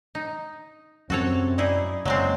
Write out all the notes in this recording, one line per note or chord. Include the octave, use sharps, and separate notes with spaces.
D#4
F#2 C3 C4 F#4 A4 C#5
D#4 E4 G#4 D5
F#1 F#3 G#3 C4 C#5